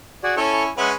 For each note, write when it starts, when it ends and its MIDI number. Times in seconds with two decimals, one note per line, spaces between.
0.23 0.35 66
0.23 0.35 68
0.23 0.35 74
0.37 0.69 61
0.37 0.69 64
0.37 0.63 69
0.37 0.63 73
0.37 0.63 85
0.78 0.94 56
0.78 0.94 61
0.78 0.94 71
0.78 0.89 73
0.78 0.89 76
0.78 0.89 78